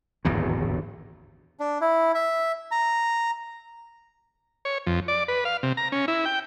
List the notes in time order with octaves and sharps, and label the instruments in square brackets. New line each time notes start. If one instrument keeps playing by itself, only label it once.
[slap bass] D1 G#1 E2 A#2
[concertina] D4
E4
E5
A#5
[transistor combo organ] C#5
F2
D5
B4
F5
C3
A#5
C#4
E4
G5